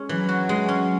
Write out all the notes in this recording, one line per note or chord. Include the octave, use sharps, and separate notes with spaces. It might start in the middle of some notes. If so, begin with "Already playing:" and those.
Already playing: G#3 C#4
E3 F#3
F#4
G#3
C#4